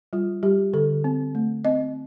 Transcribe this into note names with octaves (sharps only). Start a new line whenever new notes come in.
G3 F4
G3 G4
D3 A4
C4
A3
C4 D#5